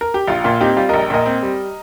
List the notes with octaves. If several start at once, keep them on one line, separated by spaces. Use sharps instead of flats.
A#4
G4
A#1 F4
A#2 F4
C4 D#4 G4
G3 F4
A#1 A#4 D#5
A#2 A#4 D#5
C4
G3